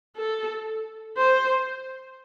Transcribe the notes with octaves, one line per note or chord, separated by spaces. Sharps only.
A4
C5